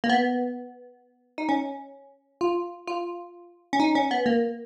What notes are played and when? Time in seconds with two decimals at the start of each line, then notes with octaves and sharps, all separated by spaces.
0.04 A#3
0.09 B3
1.38 D#4
1.49 C#4
2.41 F4
2.87 F4
3.73 C#4
3.80 D#4
3.95 C#4
4.11 B3
4.26 A#3